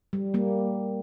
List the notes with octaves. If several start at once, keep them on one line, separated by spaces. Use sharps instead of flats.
G3
G3 A#3